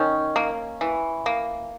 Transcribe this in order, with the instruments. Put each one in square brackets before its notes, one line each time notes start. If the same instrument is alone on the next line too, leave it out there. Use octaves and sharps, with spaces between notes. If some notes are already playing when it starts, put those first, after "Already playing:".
Already playing: [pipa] D#3 C#4
A#3
E3
A#3